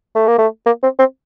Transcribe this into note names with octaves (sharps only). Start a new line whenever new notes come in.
A3
A#3
A3
A#3
C4
C4